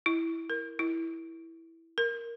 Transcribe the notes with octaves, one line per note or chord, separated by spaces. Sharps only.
E4
A#4
E4
A#4